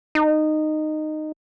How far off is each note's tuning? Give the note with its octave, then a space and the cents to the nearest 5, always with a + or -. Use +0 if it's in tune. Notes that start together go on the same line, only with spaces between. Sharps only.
D#4 -15